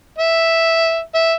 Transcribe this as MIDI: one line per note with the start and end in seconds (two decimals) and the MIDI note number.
0.18 1.01 76
1.14 1.33 76